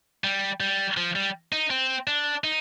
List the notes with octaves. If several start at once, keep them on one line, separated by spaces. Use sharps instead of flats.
G3
G3
F3
G3
D#4
C4
D4
D#4